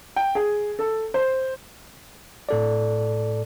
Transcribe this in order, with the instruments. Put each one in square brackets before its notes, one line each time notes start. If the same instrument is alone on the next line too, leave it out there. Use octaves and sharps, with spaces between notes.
[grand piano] G5
G#4
A4
C5
[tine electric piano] A2 A4 D5